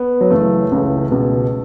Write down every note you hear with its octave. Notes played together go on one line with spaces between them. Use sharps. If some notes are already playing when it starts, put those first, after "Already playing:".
Already playing: B3
F#3
F#2 C#3 E3 A3
C#2 C#3 E3
C#2 B2